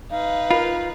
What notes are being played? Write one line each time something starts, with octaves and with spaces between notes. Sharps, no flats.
D#4 B4 F5
F4 A#4 B5